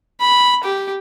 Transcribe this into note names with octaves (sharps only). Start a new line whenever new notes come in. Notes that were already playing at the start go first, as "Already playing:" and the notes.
B5
G4